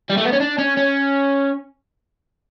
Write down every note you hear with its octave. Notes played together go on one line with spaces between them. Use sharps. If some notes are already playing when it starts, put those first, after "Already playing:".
G3
A3
B3
C#4
D4
C#4
C#4